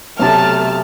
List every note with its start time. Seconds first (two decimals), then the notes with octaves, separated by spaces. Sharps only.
0.19 B1 C3 A3 A5 F6